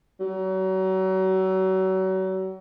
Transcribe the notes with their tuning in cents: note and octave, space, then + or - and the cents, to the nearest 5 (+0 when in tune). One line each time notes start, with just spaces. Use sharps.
F#3 +35